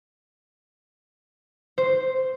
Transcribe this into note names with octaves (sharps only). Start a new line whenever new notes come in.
C5